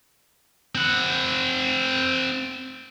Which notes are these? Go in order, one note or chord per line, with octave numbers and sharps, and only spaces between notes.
C4 F#5